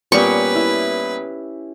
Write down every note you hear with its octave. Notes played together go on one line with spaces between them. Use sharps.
A#2 G3 B3 C#4 G4 B4 C#6
E4